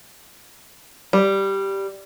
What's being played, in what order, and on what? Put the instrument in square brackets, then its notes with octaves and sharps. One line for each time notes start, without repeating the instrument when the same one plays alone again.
[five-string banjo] G3